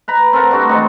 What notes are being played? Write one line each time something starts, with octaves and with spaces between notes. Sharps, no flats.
B4 A#5 B5
C4 A4 A#4 F#5
G3 A3 D4 F#4
E3 G#3 C4 D#4